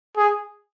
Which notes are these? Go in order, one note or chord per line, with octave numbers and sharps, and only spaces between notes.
G#4